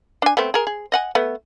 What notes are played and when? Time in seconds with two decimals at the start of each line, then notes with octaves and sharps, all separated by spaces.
0.22 D4 G#5
0.37 A3 B3 C4
0.54 G#4 A#4
0.67 G#4
0.92 D#5 F#5 G#5
1.15 A3 B3